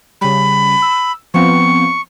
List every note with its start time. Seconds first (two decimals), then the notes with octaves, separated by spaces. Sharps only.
0.21 C#3 G3 B5
0.82 E6
1.34 F3 B3 C4 C#6